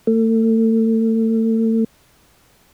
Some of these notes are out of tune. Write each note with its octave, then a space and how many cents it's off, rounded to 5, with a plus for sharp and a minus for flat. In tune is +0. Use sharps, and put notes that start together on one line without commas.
A3 +35